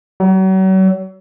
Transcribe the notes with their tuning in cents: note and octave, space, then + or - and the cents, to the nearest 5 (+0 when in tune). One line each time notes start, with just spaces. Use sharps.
F#3 +40